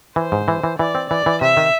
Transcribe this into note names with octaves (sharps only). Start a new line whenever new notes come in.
E3 C5
G#2
E3
E3
E3 D5
C4
E3 D5
E3
C3 E5
D#3